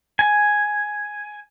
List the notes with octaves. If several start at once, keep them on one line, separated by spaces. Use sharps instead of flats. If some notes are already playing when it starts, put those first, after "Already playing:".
G#5